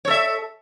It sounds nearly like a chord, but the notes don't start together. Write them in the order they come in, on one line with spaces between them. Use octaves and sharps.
C#5 A4 E5